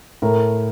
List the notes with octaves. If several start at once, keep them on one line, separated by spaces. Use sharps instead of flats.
A2 A#4